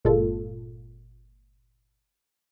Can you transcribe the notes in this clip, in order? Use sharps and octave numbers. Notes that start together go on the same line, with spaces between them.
G1 A#2 G#3 F4 A4